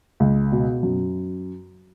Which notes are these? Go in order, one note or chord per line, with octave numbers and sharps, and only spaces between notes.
C#2
B2
F#2